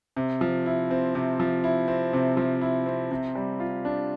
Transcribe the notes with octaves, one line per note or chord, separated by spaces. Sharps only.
C3
F3
E4
C4
C3
F3
E4
C4
C3
F3
E4
C4
C3
G3
F4
D4